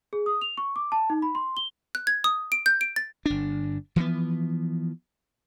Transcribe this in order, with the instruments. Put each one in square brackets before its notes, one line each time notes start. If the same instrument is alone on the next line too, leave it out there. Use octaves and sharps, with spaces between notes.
[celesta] G#4
D#6
F7
C#6
D6
A5
D#4
B5
C6
G7
[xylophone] F#6
G#6
D#6
D7
G6
D7
A6
[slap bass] G1 D4
E3 F3 G#3 B3